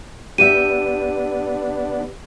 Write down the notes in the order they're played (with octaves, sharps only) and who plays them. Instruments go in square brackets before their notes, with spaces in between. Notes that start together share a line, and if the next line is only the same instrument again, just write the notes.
[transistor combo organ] B3 D4 [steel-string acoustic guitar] G4 E5 [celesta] D#7